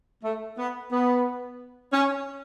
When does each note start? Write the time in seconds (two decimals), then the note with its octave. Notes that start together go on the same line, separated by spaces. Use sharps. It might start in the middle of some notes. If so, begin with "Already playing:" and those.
0.24 A3
0.58 B3
0.92 B3
1.93 C#4